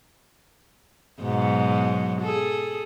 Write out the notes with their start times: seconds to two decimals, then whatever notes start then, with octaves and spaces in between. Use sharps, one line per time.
1.21 G#2 B2 F#3
2.21 G#4 A4